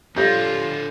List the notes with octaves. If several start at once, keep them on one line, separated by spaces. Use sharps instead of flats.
G3 D4 F4 A4 C#5 G6 A#6